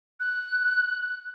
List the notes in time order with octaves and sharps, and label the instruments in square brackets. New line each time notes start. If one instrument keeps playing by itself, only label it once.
[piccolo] F#6